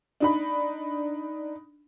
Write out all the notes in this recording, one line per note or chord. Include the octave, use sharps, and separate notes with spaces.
D4 D#4 B5